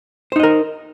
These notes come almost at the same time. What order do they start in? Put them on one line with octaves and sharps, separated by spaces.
C5 D#4 D#5 A#4